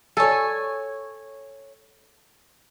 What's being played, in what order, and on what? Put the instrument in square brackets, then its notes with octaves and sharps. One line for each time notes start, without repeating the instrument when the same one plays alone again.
[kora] A4 [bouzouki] C#5 G#5